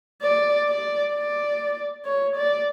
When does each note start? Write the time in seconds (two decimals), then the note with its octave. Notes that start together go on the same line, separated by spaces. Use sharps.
0.22 D5
0.68 D5
1.14 D5
2.05 C#5
2.36 D5